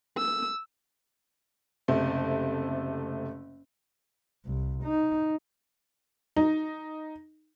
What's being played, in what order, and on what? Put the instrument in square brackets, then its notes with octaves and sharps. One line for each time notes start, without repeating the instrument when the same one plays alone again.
[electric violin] E6
[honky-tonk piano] F#1 C3 A3
[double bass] C2
D#4
[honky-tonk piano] D#4